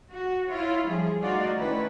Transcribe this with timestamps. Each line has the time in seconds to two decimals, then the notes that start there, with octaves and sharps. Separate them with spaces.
0.12 F#4
0.48 E4 F4 C#5
0.87 F3 G3 G#4
1.22 A3 D#4 F4 F#4 D5
1.55 D#3 A3 C#4 E4 B4